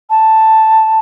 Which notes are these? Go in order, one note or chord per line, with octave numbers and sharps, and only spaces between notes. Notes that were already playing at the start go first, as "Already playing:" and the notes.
A5